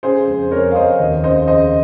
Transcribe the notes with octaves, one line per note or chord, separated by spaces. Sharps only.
C#3 G#4 C5
F2
F2 A#4 C#5
F5
F2 C5 D#5
D#2
C#3 C5 D#5
C#3 C5 D#5